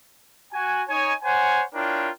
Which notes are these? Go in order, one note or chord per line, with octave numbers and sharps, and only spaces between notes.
F#4 G#5
D#4 C#5 G#5
C5 C#5 F#5 G#5
D4 E4 F4 A#4 C#5 G5